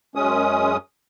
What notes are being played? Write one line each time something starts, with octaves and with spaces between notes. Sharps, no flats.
F#2 G#3 C#4 D#6